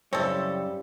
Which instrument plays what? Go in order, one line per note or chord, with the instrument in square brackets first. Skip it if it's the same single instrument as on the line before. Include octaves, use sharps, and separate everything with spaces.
[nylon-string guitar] F#2 C#3 E4 [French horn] G3 [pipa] C4 A4 [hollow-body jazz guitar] C#5